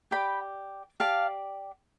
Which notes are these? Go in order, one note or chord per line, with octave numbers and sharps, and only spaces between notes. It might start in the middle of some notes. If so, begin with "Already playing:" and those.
G4 D5 G5 B5
G4 D5 F5 A5